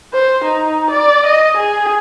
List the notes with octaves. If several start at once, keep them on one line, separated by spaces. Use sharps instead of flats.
C5
D#4
D5
D#5
G#4